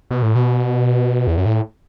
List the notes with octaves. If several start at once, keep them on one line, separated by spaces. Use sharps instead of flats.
B2
A2
B2
E2
F#2
A2